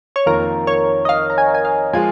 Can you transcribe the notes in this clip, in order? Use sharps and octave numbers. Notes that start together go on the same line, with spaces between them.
C#5
F2 D#3 A#3 F4 A#4
C#5
D#5
F5
A#5
G#5
G#5
F5
F3 G#3 F4 G#5